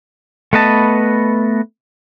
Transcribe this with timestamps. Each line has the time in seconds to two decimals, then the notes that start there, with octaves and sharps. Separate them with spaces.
0.53 A3 B3 B4 D#5 A5